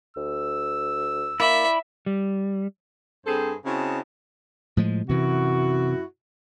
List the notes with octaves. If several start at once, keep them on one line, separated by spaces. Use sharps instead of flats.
D2 E6
A#3 E4 D5 E5 B5
G3
G2 C4 G#4 A4 C5
C#3 C4 E4 F#4 D#5 A5
A2 F3 G#3
F#2 C3 E3 E4 F#4